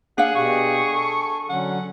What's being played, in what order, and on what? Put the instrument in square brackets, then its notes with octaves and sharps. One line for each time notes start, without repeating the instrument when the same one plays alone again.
[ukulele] D4 F5 [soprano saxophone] G#4 [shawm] F#5
[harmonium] B2 G4 [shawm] C#6
[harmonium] A4
[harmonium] D3 F#3 C#4 [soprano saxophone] F#5